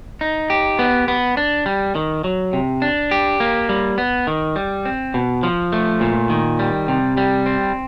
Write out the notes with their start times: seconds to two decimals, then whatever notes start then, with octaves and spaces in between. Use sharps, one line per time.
0.21 D#4
0.50 G4
0.79 B3
1.08 B3
1.37 D4
1.66 G3
1.95 D#3
2.24 F#3
2.53 C3
2.82 D4
3.11 G4
3.40 A#3
3.69 G3
3.98 B3
4.27 D#3
4.56 G3
4.85 C4
5.14 B2
5.43 F3
5.72 A3
6.01 A#2
6.30 D#3
6.59 G3
6.88 C3
7.17 G3
7.46 C4